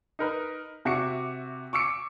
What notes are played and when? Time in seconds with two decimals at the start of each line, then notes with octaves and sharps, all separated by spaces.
0.19 D#4 A#4 B4
0.85 C3 F#4 E5 C#6 D6 C#7
1.73 C#6 D6 E6 C#7 D7